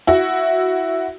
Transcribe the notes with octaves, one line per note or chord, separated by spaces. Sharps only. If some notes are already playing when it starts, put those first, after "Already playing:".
E4 F#4